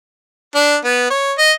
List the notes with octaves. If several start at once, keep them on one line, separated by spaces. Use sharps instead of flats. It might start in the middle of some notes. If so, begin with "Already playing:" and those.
D4
B3
C#5
D#5